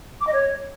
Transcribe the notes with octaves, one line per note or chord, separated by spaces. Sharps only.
D6
D#5
C#5